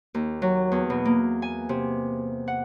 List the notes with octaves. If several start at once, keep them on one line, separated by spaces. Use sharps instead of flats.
D#2
F#3
E2
B2
A#3
G#5
C3
F#5